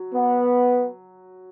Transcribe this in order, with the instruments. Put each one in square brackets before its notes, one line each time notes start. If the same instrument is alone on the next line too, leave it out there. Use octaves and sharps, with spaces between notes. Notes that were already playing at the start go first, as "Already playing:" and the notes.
Already playing: [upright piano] F#3
[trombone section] B3